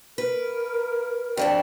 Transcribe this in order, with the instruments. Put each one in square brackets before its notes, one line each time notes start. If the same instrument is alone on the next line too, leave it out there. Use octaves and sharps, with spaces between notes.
[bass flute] A#4 [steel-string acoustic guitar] B4
[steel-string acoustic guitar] F2 D4 A5 [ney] G5